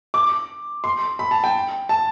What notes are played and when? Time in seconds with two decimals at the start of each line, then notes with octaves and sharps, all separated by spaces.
0.14 D6
0.84 C6
1.19 B5
1.31 A5
1.44 G5
1.89 A5